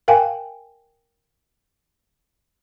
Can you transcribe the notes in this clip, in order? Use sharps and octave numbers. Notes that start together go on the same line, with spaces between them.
A#4 F5 G5 G#5